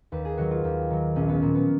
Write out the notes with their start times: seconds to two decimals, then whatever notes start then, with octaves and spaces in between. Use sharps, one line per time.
0.12 D#2 B4
0.25 G#4
0.38 D#3 F#3 F#4
0.51 F4
0.64 D#2
0.90 D#3 F#3
1.16 A#1 C#4
1.29 B3
1.42 A#2 F3 A#3
1.55 B3